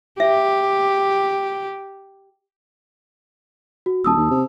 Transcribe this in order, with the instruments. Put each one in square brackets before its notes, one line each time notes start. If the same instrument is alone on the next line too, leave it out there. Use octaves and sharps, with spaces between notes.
[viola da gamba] G4 [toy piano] E5
[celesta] F#4
[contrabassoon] D#1 [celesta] A5 D#6 E6
[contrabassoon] D#2
C3